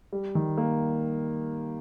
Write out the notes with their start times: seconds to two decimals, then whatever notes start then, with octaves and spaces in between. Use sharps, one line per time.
0.12 G3
0.35 D#3
0.57 A#3